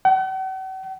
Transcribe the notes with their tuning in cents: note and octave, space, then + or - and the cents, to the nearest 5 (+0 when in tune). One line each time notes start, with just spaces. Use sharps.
F#5 +45